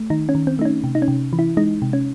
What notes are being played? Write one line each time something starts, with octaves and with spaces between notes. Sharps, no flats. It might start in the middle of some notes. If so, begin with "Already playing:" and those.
Already playing: A3
D#3 D#4
C#4
D#3
C4
A3 D#4
C#4
C3
D#4
C#4
C3
E3
E4
G#3 D#4
C3
C#4